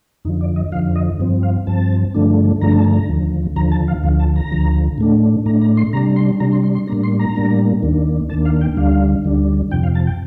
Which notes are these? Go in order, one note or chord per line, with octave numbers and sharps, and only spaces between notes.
F2 D3 F3 D#4
D5
D#5
F2 D3 F3 F5
D#5
G2 F3 C4
F5
G2 F3 C4 A5
G2 D3 F3 A3 D4
G2 D3 F3 A3 D4 A#5
A5
A#5
D#2 D3 F3
D#2 D3 F3 A#5
A5
F5
D2 D3 F3 F5
A5
A#5
D2 D3 F3
A2 A3 D4
A2 A3 D4 A#5
A#5
C6
C3 G3 D4 A#5
C6
C3 G3 D4 A#5
C6
C6
C6
A2 G3 A#3 D4 A#5
C6
A#5
A2 G3 A#3 D4
D#2 D#3 A#3 D4
D#2 D#3 A#3 D4 A5
F5
G5
D2 D3 G3 D4 F5
D2 D3 G3 D4
F2 C3 F3 G5
F5
A5
G5